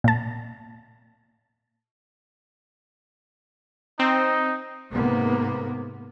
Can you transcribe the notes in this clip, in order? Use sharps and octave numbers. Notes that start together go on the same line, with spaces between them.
A#2 A5
C4 D#4
G#2 C3 A#3 B3